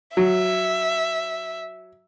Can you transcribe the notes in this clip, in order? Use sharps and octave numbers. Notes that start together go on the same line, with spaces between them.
F#3 E5